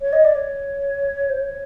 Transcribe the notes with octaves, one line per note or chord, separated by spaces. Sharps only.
C#5
D#5
D5
C#5
C5
C#5